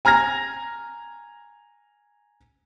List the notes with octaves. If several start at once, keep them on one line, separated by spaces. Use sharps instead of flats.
G#5 A#5 F6 G#6 A#6